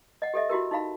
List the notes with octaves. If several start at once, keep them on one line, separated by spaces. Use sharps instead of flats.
D#5 F#5
G4 A4 D#5 E5
E4 F#4 G4 A#4
D#4 E4 F5 B5